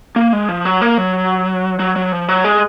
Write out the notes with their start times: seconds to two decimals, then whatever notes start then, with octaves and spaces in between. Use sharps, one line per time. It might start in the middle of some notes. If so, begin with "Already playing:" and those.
0.16 A#3
0.33 G#3
0.49 F3
0.65 F#3
0.82 A#3
0.98 F#3
1.79 F#3
1.96 F#3
2.12 F3
2.28 F#3
2.44 G#3